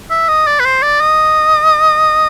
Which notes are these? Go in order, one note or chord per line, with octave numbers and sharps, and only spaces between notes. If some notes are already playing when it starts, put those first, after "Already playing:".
E5
D#5
D5
B4
C5
D5
D#5